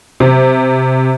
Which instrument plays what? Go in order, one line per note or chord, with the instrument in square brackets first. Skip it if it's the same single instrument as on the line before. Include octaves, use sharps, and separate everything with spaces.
[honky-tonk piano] C3